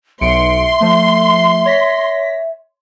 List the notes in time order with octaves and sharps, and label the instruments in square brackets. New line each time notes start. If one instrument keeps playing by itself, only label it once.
[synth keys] B1 C#7 D7 [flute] E5 [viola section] C6
[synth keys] F3 A3
C#5 A#6 B6